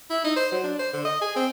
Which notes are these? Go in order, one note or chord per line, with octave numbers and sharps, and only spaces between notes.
E4
D#4
C5
F#3
D4
C5
D3
D#5
G#4
C4